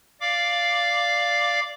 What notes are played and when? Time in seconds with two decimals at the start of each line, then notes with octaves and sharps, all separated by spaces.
0.21 D5 F5 D6